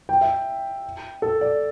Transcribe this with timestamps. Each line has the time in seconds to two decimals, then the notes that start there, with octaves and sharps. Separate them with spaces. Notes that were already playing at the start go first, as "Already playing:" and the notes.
0.09 G5
0.21 E5
1.22 A4
1.41 D5